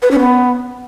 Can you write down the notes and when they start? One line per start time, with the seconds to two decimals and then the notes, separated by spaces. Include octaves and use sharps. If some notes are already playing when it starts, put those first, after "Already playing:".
0.02 B4
0.11 C#4
0.20 B3